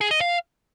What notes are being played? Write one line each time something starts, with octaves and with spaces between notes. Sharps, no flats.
G#4
D#5
F5